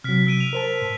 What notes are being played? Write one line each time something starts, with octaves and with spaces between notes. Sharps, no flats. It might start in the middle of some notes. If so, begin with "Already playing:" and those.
C3 F#3 F6 B6
E6 D7 D#7
F7
A#4 C5 A5
A2